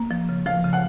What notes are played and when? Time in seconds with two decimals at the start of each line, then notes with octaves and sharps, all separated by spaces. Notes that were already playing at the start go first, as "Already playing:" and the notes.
Already playing: A#3
0.11 F3
0.29 C#3
0.46 F3 F5
0.64 C#3
0.73 F#5